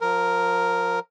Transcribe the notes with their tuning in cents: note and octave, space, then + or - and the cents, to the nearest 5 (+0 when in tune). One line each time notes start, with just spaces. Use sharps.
F3 +30 A#4 +0